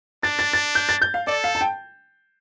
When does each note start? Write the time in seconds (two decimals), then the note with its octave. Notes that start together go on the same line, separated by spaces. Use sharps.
0.23 D4 A6
0.39 A6
0.53 A6
0.75 G6
0.89 A6
1.02 G6
1.14 F5
1.27 A4 D5
1.44 F5
1.55 A5
1.61 G5